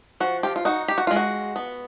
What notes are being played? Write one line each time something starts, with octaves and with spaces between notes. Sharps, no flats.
F3 F#4
F4 G4
F4
D#4 F#4
G4
F#4
G#3 F4
F#4
B3